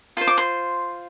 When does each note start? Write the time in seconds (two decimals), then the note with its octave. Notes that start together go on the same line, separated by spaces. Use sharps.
0.17 F4 C5 C6
0.27 D6
0.38 C6